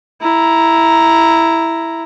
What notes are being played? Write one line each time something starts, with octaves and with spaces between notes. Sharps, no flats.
E4 A#5